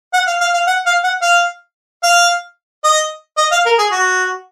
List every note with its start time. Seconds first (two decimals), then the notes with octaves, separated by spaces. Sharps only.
0.14 F#5
0.27 F5
0.40 F5
0.54 F5
0.67 F#5
0.86 F5
1.04 F#5
1.22 F5
2.03 F5
2.84 D#5
3.38 D#5
3.52 F5
3.66 A#4
3.78 G#4
3.92 F#4